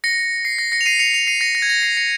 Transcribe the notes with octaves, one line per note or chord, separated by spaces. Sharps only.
A#6 C#7
C7
A#6
A#6 C#7
F7
C7 D#7
C#7 F7
C#7 F7
C7 D#7
A#6 C#7
A#6
G#6
A#6
C7
A#6 C#7